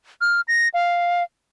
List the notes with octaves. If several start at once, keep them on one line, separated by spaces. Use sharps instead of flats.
F6
A#6
F5